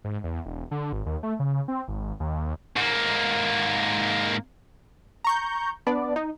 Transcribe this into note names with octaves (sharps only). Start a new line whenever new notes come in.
G#2
E2
E1
D3
G#1
D#2
A3
C#3
C4
G#1
D#2
G#2 A#3
A#5 C#6 G6
B3 D4 D5
D#4